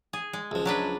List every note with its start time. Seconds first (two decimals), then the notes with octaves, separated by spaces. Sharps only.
0.13 G#4
0.33 G#3
0.51 C#2 F3
0.65 F#3 D4 B4